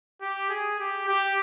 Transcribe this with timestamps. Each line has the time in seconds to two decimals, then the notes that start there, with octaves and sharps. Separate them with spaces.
0.21 G4
0.50 G#4
0.79 G4
1.07 G4